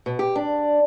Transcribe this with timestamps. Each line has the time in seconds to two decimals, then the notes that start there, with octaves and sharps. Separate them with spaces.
0.06 B2
0.19 G4
0.36 D4